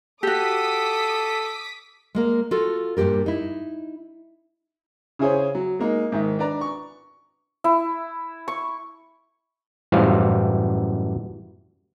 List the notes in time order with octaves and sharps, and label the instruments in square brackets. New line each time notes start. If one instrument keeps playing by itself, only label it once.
[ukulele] F#4 G4 [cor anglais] A4 [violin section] D6 D#6 B6
[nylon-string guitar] G#3 A#3 A#4
F4 F#4 A4
G2 A#2 D#3 G4 A#4
D#4 E4
[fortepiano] C#3 E4 G#4 C5 C#5
F#3
G#3 A#3 D#4
G#2 D#3 E5
D4 B4 D5 A#5
C#6
[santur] E4
C#6
[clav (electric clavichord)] F#2 A2 E3 G3 C5 F5